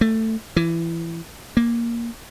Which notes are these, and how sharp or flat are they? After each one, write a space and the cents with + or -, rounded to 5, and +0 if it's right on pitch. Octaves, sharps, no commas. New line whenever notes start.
A3 +15
E3 +20
A#3 +5